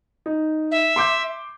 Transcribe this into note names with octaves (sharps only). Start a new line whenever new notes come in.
D#4
E5
C6 D6 G6